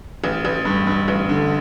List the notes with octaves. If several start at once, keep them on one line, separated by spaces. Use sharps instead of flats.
A1
A1
G2
G2
A1
D3